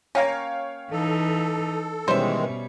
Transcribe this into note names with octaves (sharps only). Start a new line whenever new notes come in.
A#3 C#4 C#5 F5 G5
E3 D#4 A4
B2 D#3 E3 G3 G#3 C#4 C5 E5